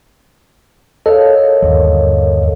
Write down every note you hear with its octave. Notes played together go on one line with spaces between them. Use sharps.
A4 A#4 C#5 D#5 F5
G1 D#2